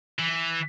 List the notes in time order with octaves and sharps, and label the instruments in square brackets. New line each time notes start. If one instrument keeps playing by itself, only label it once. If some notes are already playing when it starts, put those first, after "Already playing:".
[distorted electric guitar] E3